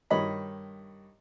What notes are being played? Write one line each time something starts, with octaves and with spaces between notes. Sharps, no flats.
G2 D#3 C#5 D#5 B5